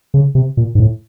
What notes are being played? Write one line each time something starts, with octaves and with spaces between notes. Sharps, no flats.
C#3
C3
A#2
G#2
A2